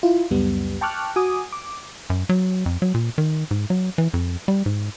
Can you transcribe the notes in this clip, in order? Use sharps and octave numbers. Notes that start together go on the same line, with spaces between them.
E4 F4
C#2 F#2 G3 B3
G5 A5 C#6 D6 F6 F#6
F#4 G#5 D6 D#6
D6
F#2
F#3
F2
F#3
A#2
D#3
G#2
F#3
E3
F2
G3
G#2